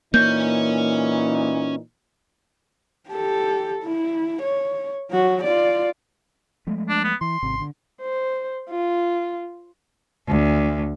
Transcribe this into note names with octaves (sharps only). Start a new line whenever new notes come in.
A#2 E3 A#3 C#4 D#4 C#5 G6
G4 A4
E4
C#5
F#3 F#4
F4 D5
F3 G#3 A3
D4
B3
E3 C6
G#1 C3
D3
C5
F4
D2